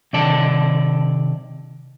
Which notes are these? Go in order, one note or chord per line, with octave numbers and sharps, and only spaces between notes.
C3 D#3 D5 A5